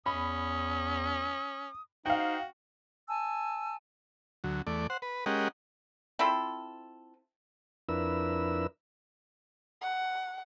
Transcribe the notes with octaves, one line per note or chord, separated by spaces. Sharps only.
E2 C#4 B5 D#6
D#4 F#4 C5 F5 G5
G#5 A5 E6
D2 F#3
E2 A3 D5
C5 F#5
B4
G#3 C#4 G4 A#4 D#5 F#5
C4 E4 F4 A4
F2 D4 E4 A#4 B4 E6
F#5